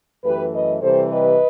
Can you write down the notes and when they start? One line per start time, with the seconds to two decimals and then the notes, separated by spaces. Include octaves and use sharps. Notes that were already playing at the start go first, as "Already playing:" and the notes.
0.24 F#2 E3 A3 G4 B4
0.53 B4 D#5
0.82 C3 E3 G3 A4 C5
1.11 B4 D#5